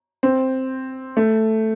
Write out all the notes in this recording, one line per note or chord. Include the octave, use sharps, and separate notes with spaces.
C4
A3